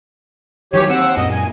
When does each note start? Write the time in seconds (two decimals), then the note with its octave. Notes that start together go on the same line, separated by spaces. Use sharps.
0.74 D#3 E3 F#3 G4 C#5
0.89 D#2 C4 F#5 E6
1.17 F#2 A#2 D#5
1.31 G#5